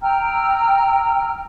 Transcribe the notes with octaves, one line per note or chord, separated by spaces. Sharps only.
G5 A#5 E6 F6